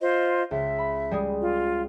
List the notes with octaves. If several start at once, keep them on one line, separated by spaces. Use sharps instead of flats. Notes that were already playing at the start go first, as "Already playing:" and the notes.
F4 C5 D#5
C#2 E5
B5
G3 G#3 G#4
F4